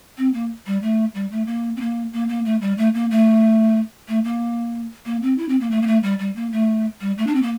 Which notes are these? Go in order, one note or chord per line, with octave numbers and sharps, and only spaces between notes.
C4
A#3
G3
A3
G3
A3
A#3
C4
A#3
A#3
A#3
A3
G3
A3
A#3
A3
A3
A#3
A#3
C4
E4
C4
A#3
A3
A#3
A3
G3
G3
A#3
A3
G3
A3
D4
C4
A#3